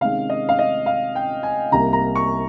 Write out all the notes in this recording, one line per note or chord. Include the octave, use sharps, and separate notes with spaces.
C3 D#3 G#3 C#4 F5
D#5
F5
D#5
F5
G5
G#5
C2 C3 G3 A#3 A#5
A#5
C#6